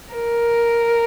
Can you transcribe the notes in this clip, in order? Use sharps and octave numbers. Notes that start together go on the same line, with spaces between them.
A#4